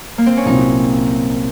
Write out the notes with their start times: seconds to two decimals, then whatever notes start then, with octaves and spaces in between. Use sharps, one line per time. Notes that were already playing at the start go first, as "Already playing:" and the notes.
0.18 A#3
0.26 C4
0.37 C#4
0.46 C2 A#2 F#3 C4 D#4